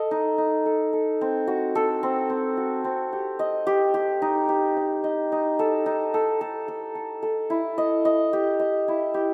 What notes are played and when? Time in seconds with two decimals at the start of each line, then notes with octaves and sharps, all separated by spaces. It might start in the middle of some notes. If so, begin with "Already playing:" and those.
Already playing: A4 D#5
0.11 D#4
0.38 D#4
0.66 A4
0.93 A4
1.21 C4
1.47 F#4
1.75 A4
2.03 C4
2.30 C4
2.57 F#4
2.84 C4
3.13 G4
3.39 D#5
3.67 G4
3.94 G4
4.22 D#4
4.49 G4
4.77 D#5
5.04 D#5
5.32 D#4
5.59 A4
5.86 D#4
6.14 A4
6.41 A4
6.68 A4
6.95 A4
7.23 A4
7.50 E4
7.78 D#5
8.05 D#5
8.33 G4
8.60 D#5
8.88 E4
9.14 G4